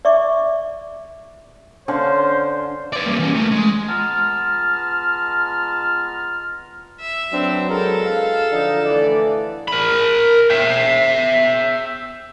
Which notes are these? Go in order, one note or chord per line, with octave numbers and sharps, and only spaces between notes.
D5 E5 C#6 D6
D3 C#4 C5 F5
B4 D5
G3 A#3
E3 C#4
A3 A#4
G#3
G#3 B3 F4 A5 A#5 F6
E5
F#3 C4 D4 B4
G#3 A4 A#4
F5
D3 F3 D4 D#4
A2 E3 D5
A#4 B5
E5 G5